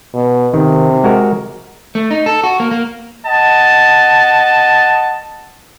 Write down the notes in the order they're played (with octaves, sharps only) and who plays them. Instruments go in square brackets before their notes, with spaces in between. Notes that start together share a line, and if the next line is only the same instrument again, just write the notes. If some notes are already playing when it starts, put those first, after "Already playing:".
[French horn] B2
[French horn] C3 [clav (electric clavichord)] D#3
[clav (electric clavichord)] G#3 F#4 A#4
[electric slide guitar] A3
D#4
A4
F#4
A#3
A#3
[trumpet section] D#5 F#5 A5